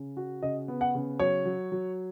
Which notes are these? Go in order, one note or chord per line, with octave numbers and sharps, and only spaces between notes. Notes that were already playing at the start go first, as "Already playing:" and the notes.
Already playing: C#3
F#4
C#3 D#5
B3
F#5
C#3
F#3 C#5
F#3
F#3